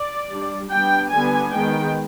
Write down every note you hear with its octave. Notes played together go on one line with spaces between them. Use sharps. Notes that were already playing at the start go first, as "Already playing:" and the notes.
Already playing: D5
G3 D4
G3 B3 D4 G5
D3 G3 B3 D4 G#5
D#3 G#3 B3 G5